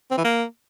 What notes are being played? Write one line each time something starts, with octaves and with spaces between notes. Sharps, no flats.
C4
E3
A#3